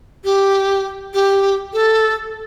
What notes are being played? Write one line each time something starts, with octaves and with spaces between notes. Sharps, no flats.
G4
G4
A4